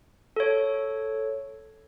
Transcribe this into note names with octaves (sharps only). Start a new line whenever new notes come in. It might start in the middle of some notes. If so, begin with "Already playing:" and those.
A4 C#5